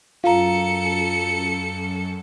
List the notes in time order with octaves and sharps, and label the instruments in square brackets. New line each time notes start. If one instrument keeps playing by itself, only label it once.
[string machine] F#2 [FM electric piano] F4 [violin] A4 C#7 [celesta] F5 A#5